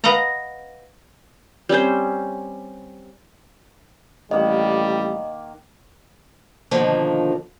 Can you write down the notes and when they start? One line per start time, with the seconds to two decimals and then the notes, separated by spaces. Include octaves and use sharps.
0.04 B4 D#5 F5 F#5 A#5
1.69 G3 C4 C#4 C5
4.31 A1 D#3 G3 A#3 D#5 F#5
6.71 B2 D3 D#3 F3 A#3